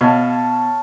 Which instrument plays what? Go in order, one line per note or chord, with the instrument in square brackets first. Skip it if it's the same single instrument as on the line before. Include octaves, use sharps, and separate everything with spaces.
[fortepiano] B2 [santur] C#5 F5 A5